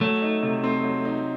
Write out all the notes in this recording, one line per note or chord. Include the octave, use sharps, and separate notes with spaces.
F#3 A3
D#4
C3
C4
F#3
D#4